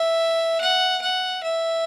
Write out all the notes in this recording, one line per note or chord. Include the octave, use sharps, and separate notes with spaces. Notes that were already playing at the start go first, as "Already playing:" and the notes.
Already playing: E5
F#5
F#5
E5